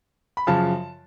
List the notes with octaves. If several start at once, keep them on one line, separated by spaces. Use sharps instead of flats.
B5
F#2 C#3 F3 A5